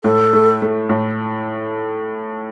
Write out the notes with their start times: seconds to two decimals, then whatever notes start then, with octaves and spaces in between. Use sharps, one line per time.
0.04 A2 A4
0.33 A3
0.62 A3
0.89 A2